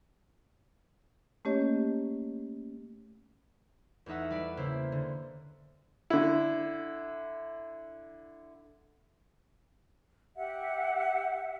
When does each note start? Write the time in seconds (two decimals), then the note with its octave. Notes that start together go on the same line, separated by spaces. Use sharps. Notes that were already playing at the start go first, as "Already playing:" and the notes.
1.45 A3 A#3 C#4 G4 C#5 D#5
4.06 E2 A3 D#4 E5 F#5
4.30 G3 B4 D5
4.57 C#3 A#3 E4 C5
4.92 D3
6.10 D3 E4
10.37 G4 E5 F#5